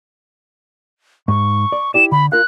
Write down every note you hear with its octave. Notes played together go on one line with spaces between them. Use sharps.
G#2 C#6
D5
E4 G4 D5 E7
D3 B5
F4 A#4 F5 F#6